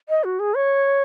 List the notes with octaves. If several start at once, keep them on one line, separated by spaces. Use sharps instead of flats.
D#5
F#4
G#4
C#5